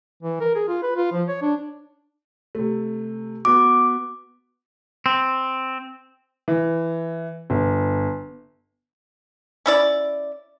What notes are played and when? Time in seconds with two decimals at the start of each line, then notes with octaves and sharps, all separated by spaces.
0.23 E3
0.41 A#4
0.55 G#4
0.68 F4
0.83 B4
0.97 F4
1.12 F3
1.29 C#5
1.42 D4
2.55 C3 A3
3.45 B3 F#4 D6
5.06 C4
6.48 E3
7.50 G1
9.66 C#4 E4 D5